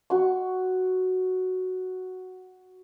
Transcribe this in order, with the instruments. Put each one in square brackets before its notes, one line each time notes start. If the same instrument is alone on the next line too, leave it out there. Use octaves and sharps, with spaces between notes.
[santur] F#4 C#6